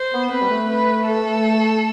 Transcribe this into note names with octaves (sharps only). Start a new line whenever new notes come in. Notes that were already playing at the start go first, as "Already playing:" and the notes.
Already playing: C5
B3
C4 B4
G3
A3
B4
A4